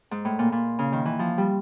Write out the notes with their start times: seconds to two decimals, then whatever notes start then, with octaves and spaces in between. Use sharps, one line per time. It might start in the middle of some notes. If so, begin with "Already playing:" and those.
0.11 G#2
0.25 A2
0.39 A#2
0.52 A#2
0.79 C#3
0.92 D#3
1.05 E3
1.19 F3
1.38 G3